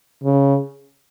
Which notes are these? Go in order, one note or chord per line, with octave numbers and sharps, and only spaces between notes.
C#3